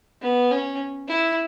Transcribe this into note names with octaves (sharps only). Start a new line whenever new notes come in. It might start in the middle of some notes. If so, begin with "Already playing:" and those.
B3
C#4
E4